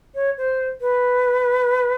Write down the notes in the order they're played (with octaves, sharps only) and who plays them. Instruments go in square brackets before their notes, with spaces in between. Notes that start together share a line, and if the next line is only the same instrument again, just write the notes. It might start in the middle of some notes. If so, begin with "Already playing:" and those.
[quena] C#5
C5
B4